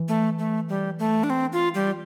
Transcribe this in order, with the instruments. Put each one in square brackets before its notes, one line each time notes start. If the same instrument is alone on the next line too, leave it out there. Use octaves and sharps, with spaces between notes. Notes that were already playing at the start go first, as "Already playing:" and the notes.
Already playing: [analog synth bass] E3
[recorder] A3
A3
G3
A3
D4
C4
F4
G3